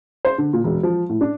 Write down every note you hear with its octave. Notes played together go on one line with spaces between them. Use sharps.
C5
D3
A#2
E1
F3
A2
D4